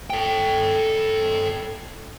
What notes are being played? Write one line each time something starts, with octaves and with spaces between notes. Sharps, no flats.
A4 G5